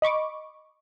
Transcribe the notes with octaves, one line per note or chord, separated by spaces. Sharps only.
D#5 B5 C#6 D6